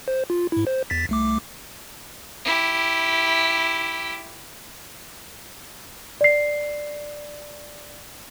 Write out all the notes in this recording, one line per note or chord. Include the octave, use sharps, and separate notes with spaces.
C5
F4
G#2 E4
C5
E2 A6 B6
C2 A3 D6
E4 G4
D5 C7